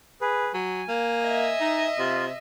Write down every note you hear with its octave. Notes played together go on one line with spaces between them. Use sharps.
G#4 B4
F#3 G#5
A#3
D#5 E5
D#4
C3 F4